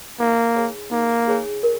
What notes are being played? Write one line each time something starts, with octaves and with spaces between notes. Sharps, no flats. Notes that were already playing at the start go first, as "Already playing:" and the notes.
A#3 D#4
G#4 C#5 G#5
A#3 D#4
G#4 C#5 G#5
A#4